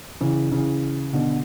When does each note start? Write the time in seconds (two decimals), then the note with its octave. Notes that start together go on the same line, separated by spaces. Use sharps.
0.21 C#3 E3
0.52 C#3 E3
1.13 B2 D3